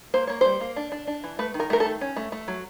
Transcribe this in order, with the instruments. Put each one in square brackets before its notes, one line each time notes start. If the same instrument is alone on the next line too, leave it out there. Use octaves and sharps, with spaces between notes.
[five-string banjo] A#3 C5
A#3 C#5
G3 C5
A#3
D4
D4
D4
E3
A3 B4
D#3
A#4
A3 A#4
A4
D#3
C#4
A3
A3
F#3